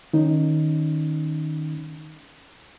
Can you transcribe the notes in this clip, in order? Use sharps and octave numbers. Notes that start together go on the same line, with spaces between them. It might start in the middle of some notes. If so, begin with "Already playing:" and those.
D#3 C#4 D#4